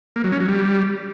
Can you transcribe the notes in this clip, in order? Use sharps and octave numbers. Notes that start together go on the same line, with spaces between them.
A#3
F#3
C#4
F#3
G3